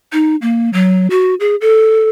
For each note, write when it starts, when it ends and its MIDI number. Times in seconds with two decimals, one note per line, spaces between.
0.13 0.36 63
0.42 0.70 58
0.73 1.09 54
1.10 1.35 66
1.40 1.56 68
1.61 2.10 69